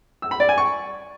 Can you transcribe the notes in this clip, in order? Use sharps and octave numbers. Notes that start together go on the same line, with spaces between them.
E6
B5
D5
G#5
C#6